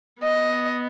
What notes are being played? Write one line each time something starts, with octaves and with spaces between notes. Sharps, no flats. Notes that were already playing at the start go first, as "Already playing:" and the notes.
B3 D#5